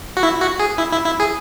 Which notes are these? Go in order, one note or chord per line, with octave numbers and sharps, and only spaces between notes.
F#4
E4
F#4
G#4
E4
E4
E4
G#4